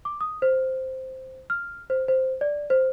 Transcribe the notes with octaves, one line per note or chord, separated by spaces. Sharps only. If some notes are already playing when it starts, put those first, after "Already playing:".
D6
D#6
C5
F6
C5
C5
D5
C5